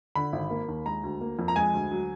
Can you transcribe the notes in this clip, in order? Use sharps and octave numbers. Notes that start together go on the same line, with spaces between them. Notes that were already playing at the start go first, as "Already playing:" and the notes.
D3 B5
G#1
A#3
D#2
G#3 A#5
D2
A#3
F2
A#5
G#3 G#5
D2
F#3